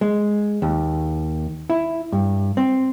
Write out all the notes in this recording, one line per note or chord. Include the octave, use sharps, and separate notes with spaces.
G#3
D#2
E4
G2
C4